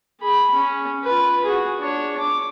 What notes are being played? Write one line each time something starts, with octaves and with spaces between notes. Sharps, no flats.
G#4 B5
C#4
F4 B4
F#4 G#4
D4 C#5
D6